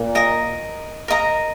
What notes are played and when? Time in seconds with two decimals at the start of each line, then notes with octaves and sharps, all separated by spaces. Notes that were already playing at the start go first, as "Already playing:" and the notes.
Already playing: A#2
0.15 A#4 D#5 A#5
1.08 A#4 D#5 A#5